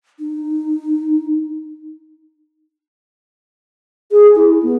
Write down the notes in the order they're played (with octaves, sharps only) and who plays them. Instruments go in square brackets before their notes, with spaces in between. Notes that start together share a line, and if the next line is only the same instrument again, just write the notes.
[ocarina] D#4
[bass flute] G#4
E4
B3